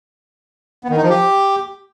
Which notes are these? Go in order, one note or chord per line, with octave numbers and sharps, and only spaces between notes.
B3
D#3
D#4
F3
G4